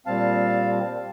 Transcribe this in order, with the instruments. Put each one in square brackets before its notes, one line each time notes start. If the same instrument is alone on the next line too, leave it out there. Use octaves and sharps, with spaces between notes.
[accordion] A#2 G3 C4 F5 A5